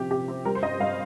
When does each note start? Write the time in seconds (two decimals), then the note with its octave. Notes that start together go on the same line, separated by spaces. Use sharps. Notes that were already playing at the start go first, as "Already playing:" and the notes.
Already playing: C3 F3 G4
0.11 C3 G4
0.28 C4
0.45 G3 A#4
0.55 C5
0.62 G2 D#5
0.80 G2 F5